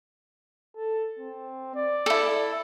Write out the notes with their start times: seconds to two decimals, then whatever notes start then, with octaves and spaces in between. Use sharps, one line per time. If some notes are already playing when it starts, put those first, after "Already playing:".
0.76 A4
1.19 C4
1.75 D5
2.06 E4 A4